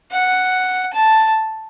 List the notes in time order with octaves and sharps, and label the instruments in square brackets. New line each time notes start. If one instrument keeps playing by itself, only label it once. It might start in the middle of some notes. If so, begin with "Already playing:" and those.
[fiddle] F#5
A5